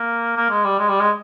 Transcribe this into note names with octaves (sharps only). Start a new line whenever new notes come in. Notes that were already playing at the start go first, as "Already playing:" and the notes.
Already playing: A#3
A#3
G#3
G3
G#3
G3
G#3